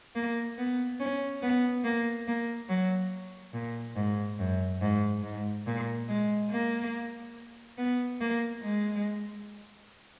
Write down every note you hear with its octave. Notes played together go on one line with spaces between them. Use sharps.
A#3
B3
C#4
B3
A#3
A#3
F#3
A#2
G#2
F#2
G#2
G#2
A#2
G#3
A#3
B3
A#3
G#3